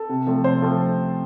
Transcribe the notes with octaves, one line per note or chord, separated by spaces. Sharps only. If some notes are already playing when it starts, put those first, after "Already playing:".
Already playing: A4
C3
F3 A3 C4
C3 C5
F3 A3 C4